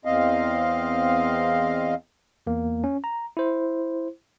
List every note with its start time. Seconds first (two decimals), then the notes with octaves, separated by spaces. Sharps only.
0.05 E2 C4 D#5 F5
2.47 E2 A#3
2.84 C#4
3.04 A#5
3.37 E4 C5